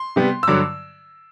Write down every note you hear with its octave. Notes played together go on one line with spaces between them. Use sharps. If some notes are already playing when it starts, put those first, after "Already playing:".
Already playing: C6
C3 G3 B3
E6
G2 D3 F#3 D6